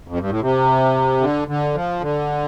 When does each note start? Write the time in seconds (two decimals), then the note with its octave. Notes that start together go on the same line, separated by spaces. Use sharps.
0.08 F2
0.19 G2
0.30 A2
0.41 C3
1.21 D3
1.48 D3
1.74 F3
2.00 D3